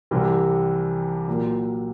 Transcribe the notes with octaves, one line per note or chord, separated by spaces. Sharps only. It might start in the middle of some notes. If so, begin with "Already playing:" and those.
C2 C3 E3 G3
A#2 F#3 A#3